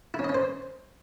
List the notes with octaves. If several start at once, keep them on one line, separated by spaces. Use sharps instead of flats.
E4
C#4
D#5
C#4
C5